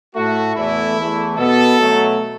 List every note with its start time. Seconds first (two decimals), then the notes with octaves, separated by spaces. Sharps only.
0.15 A2 A3 F#4
0.56 E2 E3 A3 E4
0.97 E2 E3 A3
1.37 B2 B3 A4
1.79 B2 F#3 A3